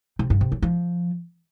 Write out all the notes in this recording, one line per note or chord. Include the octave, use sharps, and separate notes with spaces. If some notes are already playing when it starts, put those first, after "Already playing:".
C3
G2
C3
F#3
F3